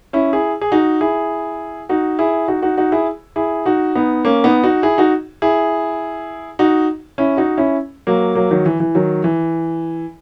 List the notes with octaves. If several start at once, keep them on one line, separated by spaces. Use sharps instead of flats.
C#4 E4
E4 G#4
G#4
D#4 F#4
E4 G#4
D#4 F#4
E4 G#4
D#4 F#4
D#4 F#4
D#4 F#4
E4 G#4
E4 G#4
D#4 F#4
B3 D#4
A#3 C#4
B3 D#4
D#4 F#4
E4 G#4
D#4 F#4
E4 G#4
D#4 F#4
C#4 E4
D#4 F#4
C#4 E4
F#3 A#3
F#3 A#3
D#3 F#3
E3
E3
D#3 F#3
E3